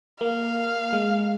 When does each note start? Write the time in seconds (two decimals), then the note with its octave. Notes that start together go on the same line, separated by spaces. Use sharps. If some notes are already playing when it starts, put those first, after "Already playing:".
0.20 A#3 F5
0.93 G#3